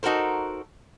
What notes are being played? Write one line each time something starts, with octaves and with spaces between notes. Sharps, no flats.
D#4 F#4 A4 A#4 C5